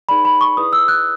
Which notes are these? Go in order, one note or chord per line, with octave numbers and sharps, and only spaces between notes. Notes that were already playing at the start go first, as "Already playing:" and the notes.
D#4 G#4 B4 D5 B5
B5
C#6
E4 G#4 B4 D5 D#6
E6
F#6